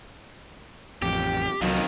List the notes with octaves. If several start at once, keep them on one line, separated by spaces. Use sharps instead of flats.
A1 F2 G4
C2 F2 D#3 F#3